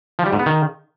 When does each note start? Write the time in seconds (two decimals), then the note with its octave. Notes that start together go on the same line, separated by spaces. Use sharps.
0.19 F3
0.26 G3
0.33 G#2
0.39 B3
0.46 D#3